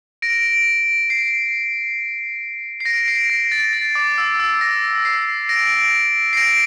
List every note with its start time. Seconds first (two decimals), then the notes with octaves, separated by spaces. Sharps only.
0.22 A#6 D7
1.10 C7
2.80 C7
2.85 A#6 D7
3.08 C7
3.30 A#6
3.52 A6
3.73 A6
3.95 D6
4.18 E6
4.40 E6
4.61 A#6
5.05 C7
5.49 A#6 D7
6.33 C7
6.37 A#6 D7